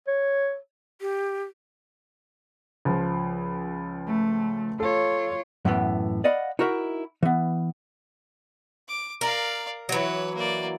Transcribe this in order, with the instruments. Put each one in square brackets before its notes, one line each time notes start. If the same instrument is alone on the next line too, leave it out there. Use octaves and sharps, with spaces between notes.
[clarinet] C#5
[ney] G4
[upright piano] C#2 F3
[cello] A3
[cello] F4 C#5 [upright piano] A4
[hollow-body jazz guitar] F#2 A2 E3 B3
D5 D#5 F5 F#5 B5
D#4 E4 F#4 A#4 E5
E3 B3
[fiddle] D6
[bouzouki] A#4 [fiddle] D5 F5
[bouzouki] E3 F#3 [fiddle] B4 C#5
[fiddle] A#3 D5